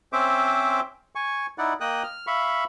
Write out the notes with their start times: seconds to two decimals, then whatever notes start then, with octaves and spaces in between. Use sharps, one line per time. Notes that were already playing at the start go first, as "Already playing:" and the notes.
0.13 C4 C#4 C5 E5 D6
1.15 G#5 C#6
1.58 D#4 E4 D5 F#5
1.81 A#3 D#5 G5 D#6 F#6
2.03 F6
2.27 E5 F5 B5 C#6